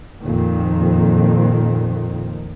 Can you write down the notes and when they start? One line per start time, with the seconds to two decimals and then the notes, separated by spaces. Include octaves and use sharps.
0.21 F2 A#2 D#3